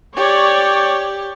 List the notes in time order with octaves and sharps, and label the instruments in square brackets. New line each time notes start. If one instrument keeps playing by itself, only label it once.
[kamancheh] G4 [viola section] C#5 D5